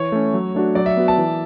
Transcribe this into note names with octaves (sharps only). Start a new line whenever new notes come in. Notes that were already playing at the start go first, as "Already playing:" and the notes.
Already playing: E3 C#5
A3 C#4
F#3
A3 D4 F#4
F#3 D5
E5
B3 F#4
A5
E3